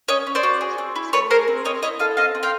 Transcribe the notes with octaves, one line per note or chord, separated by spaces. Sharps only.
C#4 C#5 D#5
C#4
C5 D5
F#4
G#4
C4
E4
A3 B4 C#5
G#4 A#4 C5
C4
C4 C#5 D#5
E4 C#5 D#5
A4 D#5 F5
C4 D#5 F5
C4
F5 G5